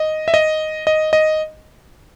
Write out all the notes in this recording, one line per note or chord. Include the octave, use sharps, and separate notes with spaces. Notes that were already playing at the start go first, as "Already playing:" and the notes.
Already playing: D#5
E5
D#5
D#5
D#5